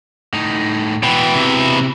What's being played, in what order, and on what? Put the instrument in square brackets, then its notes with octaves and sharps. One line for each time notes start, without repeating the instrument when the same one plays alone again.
[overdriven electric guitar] A2 D#4
[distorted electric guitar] B2 E3 [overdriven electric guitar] G5
[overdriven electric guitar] C3